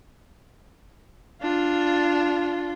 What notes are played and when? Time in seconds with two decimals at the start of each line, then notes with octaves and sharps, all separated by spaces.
1.41 D4 F4